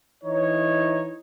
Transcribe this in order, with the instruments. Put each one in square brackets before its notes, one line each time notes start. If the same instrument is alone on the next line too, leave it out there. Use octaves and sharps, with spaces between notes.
[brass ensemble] E3 D#4 C#5